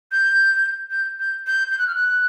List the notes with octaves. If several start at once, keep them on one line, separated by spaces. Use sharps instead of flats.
G6
G6
G6
G6
G6
F#6
F6
F#6